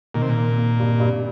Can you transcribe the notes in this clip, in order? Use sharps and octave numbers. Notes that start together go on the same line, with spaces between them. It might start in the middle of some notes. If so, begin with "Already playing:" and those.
A#2 D#3
C3
A#2
A#3
A#3
G2
G2